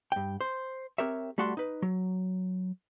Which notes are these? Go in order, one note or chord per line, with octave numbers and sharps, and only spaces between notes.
G2 G5
C5
C4 G4 A#4 C#5 E5
G3 A3 F#4 F#5 A5 C6
D#4 B4
F#3